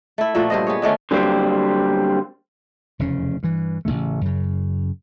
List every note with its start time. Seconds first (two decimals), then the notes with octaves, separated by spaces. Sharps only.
0.18 A3 E4
0.35 A#2 F3 A3 F#4
0.50 G2 C5 D#5
0.67 B3 G#4 C#5
0.82 D3 D#3 A3 C#4
1.11 D3 F#3 G3 A#3 C4
2.99 F1 E2 C#3 C#4
3.43 G2 E3
3.85 A1 A2 C#3 A3
4.21 F#2 C#3